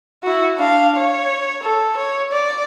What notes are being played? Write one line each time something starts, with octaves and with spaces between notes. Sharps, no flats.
E4 F#4
D4 F5
C#5
A4
C#5
D5